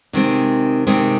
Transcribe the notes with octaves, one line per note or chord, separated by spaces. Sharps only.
C3 D#3 G#3 C4
C3 D#3 G#3 C4